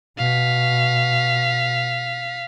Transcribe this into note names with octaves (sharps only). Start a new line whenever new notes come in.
B2 F5 B6